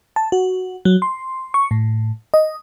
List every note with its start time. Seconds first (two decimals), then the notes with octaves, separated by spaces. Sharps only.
0.16 A5
0.32 F#4
0.85 F#3
1.02 C6
1.54 C#6
1.71 A2
2.34 D#5